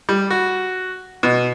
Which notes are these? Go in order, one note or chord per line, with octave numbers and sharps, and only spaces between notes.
G3
F#4
B2